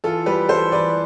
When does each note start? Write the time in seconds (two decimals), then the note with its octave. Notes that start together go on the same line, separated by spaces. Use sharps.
0.04 E3 F4 A4
0.26 G3 G4 B4
0.49 E3 A4 C5
0.72 E3 B4 D5